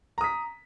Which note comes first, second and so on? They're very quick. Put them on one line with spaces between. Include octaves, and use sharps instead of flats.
A#5 D#6 B6